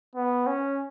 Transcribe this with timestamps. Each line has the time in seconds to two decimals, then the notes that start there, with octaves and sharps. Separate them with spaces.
0.16 B3
0.47 C#4